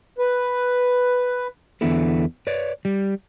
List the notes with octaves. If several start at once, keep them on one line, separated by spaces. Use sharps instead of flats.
B4
E2 D3 B3 E4 A4
B4 C#5 D5
G3